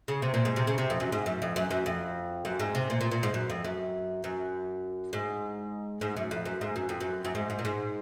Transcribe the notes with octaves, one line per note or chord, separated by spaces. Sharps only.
C#3
C3
A#2
G#2
C3
C#3
C3
F2
F#2
G#2
F#2
F2
F#2
F#2
F2
F#2
G#2
C3
A#2
A#2
A#2
G#2
F#2
F2
F#2
F#2
G#2
G#2
F#2
F2
F#2
G#2
F#2
F2
F#2
F#2
G#2
G#2
A#2
G#2